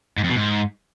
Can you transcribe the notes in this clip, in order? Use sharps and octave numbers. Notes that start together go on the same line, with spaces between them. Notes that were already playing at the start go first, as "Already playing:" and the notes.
G#2
F2
B2
G#2